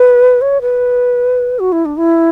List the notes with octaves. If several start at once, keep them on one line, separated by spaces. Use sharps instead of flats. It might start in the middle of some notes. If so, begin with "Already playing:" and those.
Already playing: B4
C#5
B4
F#4
E4
D4
E4